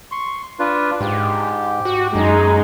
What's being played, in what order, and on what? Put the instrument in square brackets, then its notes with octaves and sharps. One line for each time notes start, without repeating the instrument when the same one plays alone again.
[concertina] C6 C#6
D4 F4 B4
[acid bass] G#2 [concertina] G4
[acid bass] F#4
[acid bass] F#2 [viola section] G#3 D#4